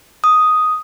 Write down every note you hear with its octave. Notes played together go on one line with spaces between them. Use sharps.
D#6